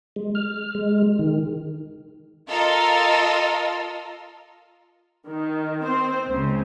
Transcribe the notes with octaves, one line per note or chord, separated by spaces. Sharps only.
G#3
F6
G#3
D#3
F4 A4 A#4 D#5 F5
D#3
C4 C5
C#2 C#3